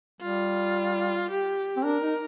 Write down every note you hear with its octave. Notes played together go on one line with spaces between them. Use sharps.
G3 F4
G4
C4
D4 A#4
D#4